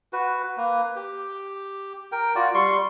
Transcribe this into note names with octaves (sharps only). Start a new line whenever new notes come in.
F#4 B4
A#3 B4
G4
A#4 G5
F4 F#4 D5
G3 C6 C#6